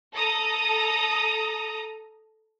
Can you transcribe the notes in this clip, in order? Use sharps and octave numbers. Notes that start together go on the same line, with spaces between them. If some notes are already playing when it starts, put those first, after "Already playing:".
A4 A#5 D#6